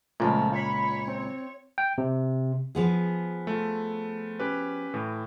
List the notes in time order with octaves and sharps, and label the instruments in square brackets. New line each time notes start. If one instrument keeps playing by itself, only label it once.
[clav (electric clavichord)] C#2 A#2 [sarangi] F3 [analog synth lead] A3
[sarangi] C#5 [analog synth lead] B5
[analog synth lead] C4
[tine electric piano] G5
C3
[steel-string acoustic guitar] F3 B3 G#4
[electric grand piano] A3 F4
C#4 G4 B4
A2 E3